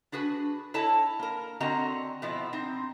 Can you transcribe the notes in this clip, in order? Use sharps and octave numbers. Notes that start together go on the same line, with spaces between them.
D4 F#4 G#4 B4
E4 A4 C#5 D#5 A5
A#3 A#4
D3 C4 C#4 F#4 D#5 A#5
B2 F3 E4 D#5
C4 D#4